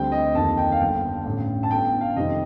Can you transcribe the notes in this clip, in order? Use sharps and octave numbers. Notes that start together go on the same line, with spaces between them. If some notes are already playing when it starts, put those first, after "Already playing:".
Already playing: D2 D3 G3 C4 G5
D#5
F2 D#3 A#3 A5
G5
F5
G1 G2 D3 G5
A1 G2 D3
A5
G1 G2 D3 G5
F5
F2 C3 D#3 G3 C4 D#5